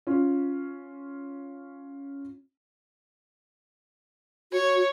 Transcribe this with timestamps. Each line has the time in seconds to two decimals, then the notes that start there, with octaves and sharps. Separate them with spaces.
0.07 C#4 F4
4.52 F#4 C#5